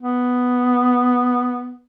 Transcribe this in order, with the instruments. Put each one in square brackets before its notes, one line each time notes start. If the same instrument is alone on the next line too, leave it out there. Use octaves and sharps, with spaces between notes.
[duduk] B3